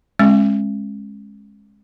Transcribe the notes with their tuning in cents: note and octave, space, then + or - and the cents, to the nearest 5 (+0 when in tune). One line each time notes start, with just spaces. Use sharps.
G#3 +0 C#4 -35